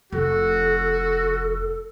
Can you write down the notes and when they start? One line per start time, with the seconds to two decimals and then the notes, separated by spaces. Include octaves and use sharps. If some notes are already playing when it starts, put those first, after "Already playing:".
0.12 F1 F#4 A4